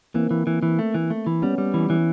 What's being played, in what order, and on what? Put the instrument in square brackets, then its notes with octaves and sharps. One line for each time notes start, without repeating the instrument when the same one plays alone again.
[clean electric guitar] E3 [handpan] A#3 C4
[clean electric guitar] E3
E3
E3
A3
E3
A3
E3
[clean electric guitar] G3 [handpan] B3 C#4
[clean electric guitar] G3
E3
E3